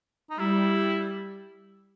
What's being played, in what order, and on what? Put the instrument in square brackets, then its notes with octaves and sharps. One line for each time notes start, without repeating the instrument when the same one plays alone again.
[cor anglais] D#4
[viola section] G3 [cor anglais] E4